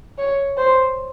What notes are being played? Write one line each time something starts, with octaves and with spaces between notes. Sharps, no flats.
C#5
C5